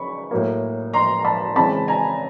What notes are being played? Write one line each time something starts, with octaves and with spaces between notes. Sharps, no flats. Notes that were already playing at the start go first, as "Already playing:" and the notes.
Already playing: C#3 B5 C#6
A2 F#3 A#3
A#5 C6
A#5
A5 B5
C#3 E3 G#3 C4 A5 B5
G#5 A#5